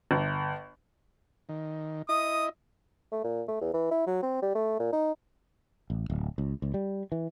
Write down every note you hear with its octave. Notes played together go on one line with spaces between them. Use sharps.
G1
D#3
E4 D#5 D#6
A3
A#2
A3
E2
E3
E4
F#3
C4
G3
A3
A#2
D#4
A1
D1
C#2
C#2
G3
E3